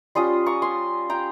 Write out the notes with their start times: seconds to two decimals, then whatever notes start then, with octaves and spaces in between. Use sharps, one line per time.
0.15 G3 C#4 F4 C6 D#6
0.46 A#5 C#6
0.62 G#5 C6
1.10 G5 A#5